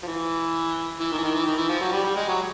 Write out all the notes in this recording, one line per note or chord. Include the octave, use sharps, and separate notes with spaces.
F3
E3
E3
D#3
E3
D#3
E3
D#3
E3
F3
F#3
G3
G3
G#3
F#3